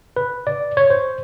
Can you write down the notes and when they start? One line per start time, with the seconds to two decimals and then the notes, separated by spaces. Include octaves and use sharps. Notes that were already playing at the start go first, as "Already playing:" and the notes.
0.17 B4
0.47 D5
0.77 C#5
0.90 C5